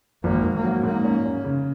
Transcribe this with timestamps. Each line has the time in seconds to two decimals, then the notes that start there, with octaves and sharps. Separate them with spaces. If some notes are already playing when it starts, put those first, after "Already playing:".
0.24 G#1 A#3
0.44 G#1
0.54 A#3
0.63 F#3
0.84 G#2 A#3
1.05 C#4
1.25 C#4
1.44 C#3